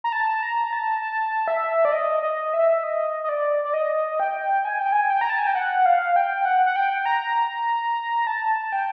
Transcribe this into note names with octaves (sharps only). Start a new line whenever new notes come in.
A#5
A5
A#5
A5
A5
E5
D5
D#5
D#5
E5
D#5
D#5
D5
D5
D#5
G5
G#5
G5
G#5
G5
A#5
A5
G#5
G5
F#5
F5
G5
F#5
F#5
G5
A#5
A5
G5